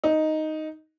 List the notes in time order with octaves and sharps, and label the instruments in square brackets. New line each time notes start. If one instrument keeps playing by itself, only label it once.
[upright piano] D#4